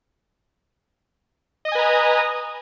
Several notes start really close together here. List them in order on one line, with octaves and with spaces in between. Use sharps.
D#5 D#6 G#5 B4 A#5